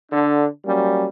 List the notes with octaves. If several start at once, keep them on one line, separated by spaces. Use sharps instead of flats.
D3 D4
F#3 G3 A#3 C#4